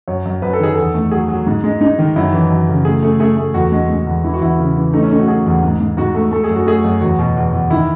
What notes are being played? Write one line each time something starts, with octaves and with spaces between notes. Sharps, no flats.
F#2 C#5
F#2
F#2 B4
A4
D#3 G#4
E2 A4
A3
F#3 G#4
F#3
G#2
G#3
G#3 D#4
D#3
F#2 E4
E3
F#2
C#3
A3 G#4
A3
A3 G#4
A3
E2 F#4
G#3
G#3
E2
E3 E4
F#4
E2 E4
C#3
E3
A3 D#4
C#4
A3 D#4
F#4
F#3 G#4
E2
G#2
G#2
G#2 F#4
A3
A3 A4
G#4
F#2
F#4
A3 G#4
F#2
E2 F#4
B2
E2
E2
D#3 E4